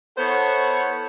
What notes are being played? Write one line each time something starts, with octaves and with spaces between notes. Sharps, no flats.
B3 E4 A4 C5 C#5 F#5